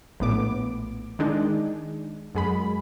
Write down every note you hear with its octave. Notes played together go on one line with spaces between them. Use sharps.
A#1 A2 B3 D6
D#3 G#3 D4 D#4
F#2 G#3 B5